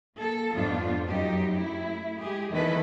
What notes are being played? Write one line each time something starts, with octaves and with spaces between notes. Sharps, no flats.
A#3 A4
F2 G#2 B3 D4 F4
F#2 F#3 D#4 G4
A3 E4
G#3 G4 G#4
E2 D#3 E3 E4 A4 B4